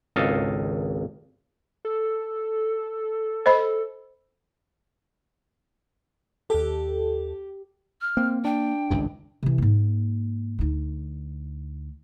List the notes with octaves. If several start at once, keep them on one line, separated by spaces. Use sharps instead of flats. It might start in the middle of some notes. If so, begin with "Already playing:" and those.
G#1 C#2 A4 D#5 F5
A4
C5 D#5 B5
D#2 G4 A4
F6
A#3 C4
D4 G5
G#1 C#2 G2
C3 E3
G#2 A#3
D2 D#4